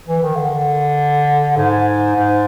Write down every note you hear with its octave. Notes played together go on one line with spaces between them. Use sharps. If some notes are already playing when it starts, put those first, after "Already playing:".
E3
D#3
D3
G#2
G#2